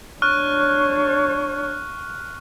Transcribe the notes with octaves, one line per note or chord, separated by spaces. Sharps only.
D4 C#5 C#6 F6 F#6